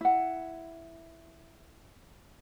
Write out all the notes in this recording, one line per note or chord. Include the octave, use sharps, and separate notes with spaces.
E4 F#5